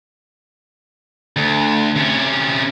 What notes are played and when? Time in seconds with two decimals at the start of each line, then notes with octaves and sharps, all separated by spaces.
1.36 D2
1.96 C3 C#4